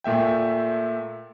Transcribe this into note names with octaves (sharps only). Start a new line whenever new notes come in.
A#2 A3 E5 G5